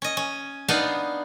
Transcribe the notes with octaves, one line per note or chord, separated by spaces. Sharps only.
C#4 D#5
C#4
B3 D4 D#4 F5